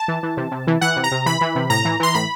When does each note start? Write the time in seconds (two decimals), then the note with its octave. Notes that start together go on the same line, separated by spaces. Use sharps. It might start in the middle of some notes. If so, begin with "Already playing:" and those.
Already playing: A5
0.08 E3
0.23 E3
0.37 C3
0.51 C3
0.67 E3
0.81 E3 F#5
0.96 C3
1.04 A#5
1.11 C3
1.26 E3 B5
1.41 E3
1.55 C3
1.70 A2 A#5
1.85 E3
2.00 E3 C6
2.14 A2 B5